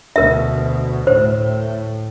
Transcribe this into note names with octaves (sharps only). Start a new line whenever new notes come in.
D2 B2 A#4 E5
A2 C5